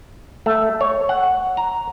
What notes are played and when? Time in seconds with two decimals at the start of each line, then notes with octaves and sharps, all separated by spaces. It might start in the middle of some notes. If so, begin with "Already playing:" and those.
0.46 A3
0.81 C#5
1.09 F#5
1.57 A#5